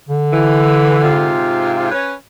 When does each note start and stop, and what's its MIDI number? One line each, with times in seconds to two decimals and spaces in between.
0.09 1.49 50
0.33 1.02 52
1.04 1.90 44
1.04 1.90 48
1.04 1.90 65
1.92 2.14 61
1.92 2.14 71
1.92 2.14 73